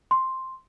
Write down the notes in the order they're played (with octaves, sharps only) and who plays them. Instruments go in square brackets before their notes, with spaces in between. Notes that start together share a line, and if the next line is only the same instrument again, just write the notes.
[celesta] C6